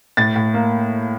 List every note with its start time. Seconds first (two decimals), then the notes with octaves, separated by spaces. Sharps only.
0.17 A2 A6
0.36 A2
0.54 A#3